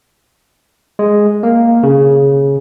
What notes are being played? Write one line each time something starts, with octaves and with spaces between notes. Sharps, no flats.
G#3
A#3
C#3